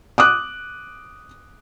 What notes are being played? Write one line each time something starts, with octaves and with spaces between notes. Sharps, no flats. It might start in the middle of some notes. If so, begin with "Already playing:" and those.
D6 D#6 F#6